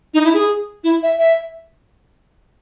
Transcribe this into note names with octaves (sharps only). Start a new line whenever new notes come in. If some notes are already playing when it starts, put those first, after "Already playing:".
D#4
E4
G#4
E4
E5
E5